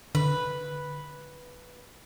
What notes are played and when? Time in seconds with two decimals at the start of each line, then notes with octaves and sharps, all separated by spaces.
0.15 D3 B4